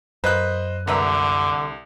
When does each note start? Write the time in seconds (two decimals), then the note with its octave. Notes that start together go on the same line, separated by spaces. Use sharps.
0.24 F#2 A#3 B4 C5 D#5 F#6
0.87 C2 D3 A#4 B4 E5